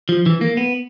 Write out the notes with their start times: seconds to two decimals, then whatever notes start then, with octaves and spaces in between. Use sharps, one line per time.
0.09 F3
0.26 E3
0.41 A#3
0.57 B3